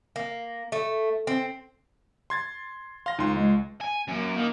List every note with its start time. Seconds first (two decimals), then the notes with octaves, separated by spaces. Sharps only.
0.16 A#3
0.72 A3
1.27 C4
2.30 C6 G#6 A6
3.06 F5 C6 A#6
3.19 C#2 D#4 C6
3.37 G#3
3.81 G#5
4.08 F#2 A#3
4.37 D#3 A#3